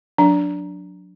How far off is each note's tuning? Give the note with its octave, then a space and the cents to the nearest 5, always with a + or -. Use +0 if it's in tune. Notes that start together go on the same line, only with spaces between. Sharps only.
F#3 -30 D4 -5